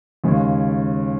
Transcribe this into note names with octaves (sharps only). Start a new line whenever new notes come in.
D#2 C#3 G#3 C#4